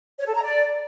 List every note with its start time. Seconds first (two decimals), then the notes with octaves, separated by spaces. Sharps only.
0.18 C#5
0.26 A4
0.34 A#5
0.42 D5